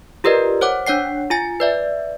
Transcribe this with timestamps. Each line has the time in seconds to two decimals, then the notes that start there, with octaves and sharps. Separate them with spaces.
0.24 F4 G4 A#4 B4 D5 D#5
0.61 C5 C#5 F#5 D6
0.87 D4 C#5 F#5 C7
1.30 F4 G#5 A6
1.60 B4 D5 E5